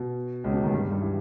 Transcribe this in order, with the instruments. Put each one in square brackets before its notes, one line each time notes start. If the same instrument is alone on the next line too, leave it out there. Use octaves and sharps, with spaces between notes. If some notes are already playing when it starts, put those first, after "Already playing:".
Already playing: [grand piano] B2
C#2 C#3
B2
D#2 D#3
G2 G3
G2 G3
E3